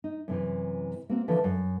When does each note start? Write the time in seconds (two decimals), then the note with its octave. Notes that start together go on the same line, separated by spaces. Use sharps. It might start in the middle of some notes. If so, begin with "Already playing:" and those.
0.04 D#4
0.28 F#2 C3 E3
1.09 A#3 C4 F#4
1.28 D3 E3 F3
1.44 F#2